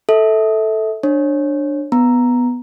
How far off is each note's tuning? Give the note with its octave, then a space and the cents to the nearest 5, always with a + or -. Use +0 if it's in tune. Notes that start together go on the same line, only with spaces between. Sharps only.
A4 +0 E5 -30
D4 +10 C#5 -30
B3 +0 A#5 +0